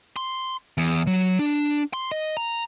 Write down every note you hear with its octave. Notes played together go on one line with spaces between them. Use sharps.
C6
E2
F#3
D4
C6
D#5
A#5